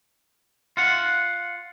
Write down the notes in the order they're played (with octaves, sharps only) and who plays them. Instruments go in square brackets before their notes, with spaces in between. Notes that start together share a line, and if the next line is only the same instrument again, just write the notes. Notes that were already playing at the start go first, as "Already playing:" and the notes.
[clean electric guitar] F4 F#5